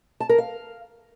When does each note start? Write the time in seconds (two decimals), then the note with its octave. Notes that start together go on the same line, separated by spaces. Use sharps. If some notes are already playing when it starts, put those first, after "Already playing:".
0.20 A5
0.29 A#4
0.38 F5